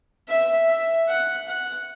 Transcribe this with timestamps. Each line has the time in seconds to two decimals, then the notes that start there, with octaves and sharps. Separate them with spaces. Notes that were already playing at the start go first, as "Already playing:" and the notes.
0.29 E5
0.68 E5
1.08 F#5
1.48 F#5